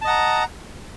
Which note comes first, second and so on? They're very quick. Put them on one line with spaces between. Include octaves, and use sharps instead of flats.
A5 D#5 F#5 A#5